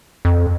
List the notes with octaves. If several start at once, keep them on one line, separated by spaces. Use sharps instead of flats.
F2